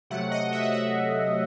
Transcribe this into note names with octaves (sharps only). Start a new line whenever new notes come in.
C3 F#3 A3 F#5
D#5
E5
F#5
E5